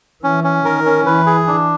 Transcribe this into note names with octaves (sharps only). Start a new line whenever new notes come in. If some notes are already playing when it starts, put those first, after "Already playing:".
E3 C#4
C#4
D#3 A#4
C#4
E3 B4
G#4
D4